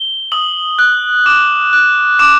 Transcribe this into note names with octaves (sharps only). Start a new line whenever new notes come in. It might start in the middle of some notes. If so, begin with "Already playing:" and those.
Already playing: G7
D#6 F#7
F#6
D6 E7
F#6
D6 E7